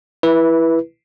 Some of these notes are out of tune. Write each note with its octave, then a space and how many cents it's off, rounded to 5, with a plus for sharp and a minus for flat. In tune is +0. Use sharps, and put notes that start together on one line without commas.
E4 +5 B4 -15